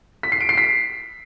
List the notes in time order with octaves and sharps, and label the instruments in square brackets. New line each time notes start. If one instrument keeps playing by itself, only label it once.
[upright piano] B6
C7
D7
C7
B6